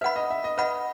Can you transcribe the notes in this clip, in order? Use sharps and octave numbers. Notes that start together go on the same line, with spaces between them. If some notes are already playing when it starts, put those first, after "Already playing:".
B4 E5 F#5 B5
D#5
E5
D#5
B4 D#5 F#5 B5